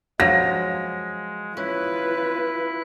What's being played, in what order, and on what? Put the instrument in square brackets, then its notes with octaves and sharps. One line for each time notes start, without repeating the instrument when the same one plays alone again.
[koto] F3 F#3 [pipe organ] G#3 [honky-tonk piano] A#6
[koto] C#4 [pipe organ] E4 F#6 [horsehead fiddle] F4 B4